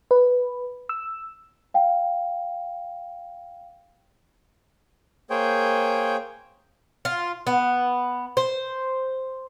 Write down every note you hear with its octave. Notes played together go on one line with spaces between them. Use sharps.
B4
E6
F5 G5
A#3 G#4 C5 C#5 G5
F4
B3
C5